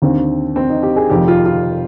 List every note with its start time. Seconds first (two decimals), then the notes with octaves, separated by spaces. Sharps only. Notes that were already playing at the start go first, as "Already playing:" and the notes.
0.02 D#2 D3 C4
0.56 C4
0.69 D#4
0.83 G4
0.96 G#4
1.10 F1 F2 D#3 G4
1.28 F4
1.46 F4